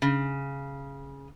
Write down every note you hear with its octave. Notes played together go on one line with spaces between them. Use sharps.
C#3